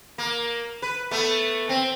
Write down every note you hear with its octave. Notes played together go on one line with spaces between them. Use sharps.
A#3
B4
A3 B3
C4